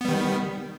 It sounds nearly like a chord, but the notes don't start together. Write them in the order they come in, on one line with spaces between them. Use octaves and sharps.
B3 G3 D#3